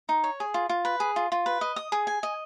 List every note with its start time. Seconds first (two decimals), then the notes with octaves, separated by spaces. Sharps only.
0.09 D#4
0.24 C#5
0.40 G#4
0.54 F4
0.69 F4
0.85 B4
1.00 G#4
1.16 F4
1.32 F4
1.46 B4
1.61 D#5
1.76 D#6
1.92 G#4
2.07 G#5
2.23 D#5